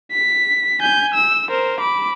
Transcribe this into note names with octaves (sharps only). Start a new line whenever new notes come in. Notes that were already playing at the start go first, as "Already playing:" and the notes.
B6
G#5 G6
E6
A#4 C5
B5 D6